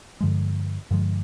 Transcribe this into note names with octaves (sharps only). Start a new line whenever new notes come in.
G2 D3 F3 G#3
G2 D3 F3 G#3